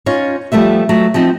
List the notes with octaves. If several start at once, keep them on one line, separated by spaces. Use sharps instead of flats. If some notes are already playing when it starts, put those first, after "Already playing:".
C#4 D#4 F4 C#5
F3 G3 A3 B3 E5
F#3 A3
F3 B3 C4 D#4